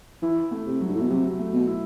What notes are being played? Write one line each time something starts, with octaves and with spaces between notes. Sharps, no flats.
E3 E4
A3
C3
F#3
G2
A2
B2
C3 F#3
A3
B2
E4